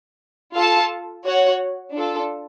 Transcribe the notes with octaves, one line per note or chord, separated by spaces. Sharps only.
F4 A4 F5 A5
F#4 C#5 F#5
D4 F4 A4